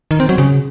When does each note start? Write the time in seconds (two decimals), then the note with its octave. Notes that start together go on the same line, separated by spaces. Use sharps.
0.11 D#3
0.20 C4
0.29 F#3
0.38 C#3